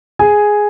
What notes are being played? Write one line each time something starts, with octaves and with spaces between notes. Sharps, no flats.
G#4 G#5